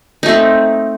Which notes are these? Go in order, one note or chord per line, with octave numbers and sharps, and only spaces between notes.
A3 C4 D#4